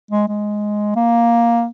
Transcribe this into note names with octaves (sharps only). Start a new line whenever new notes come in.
G#3
G#3
A#3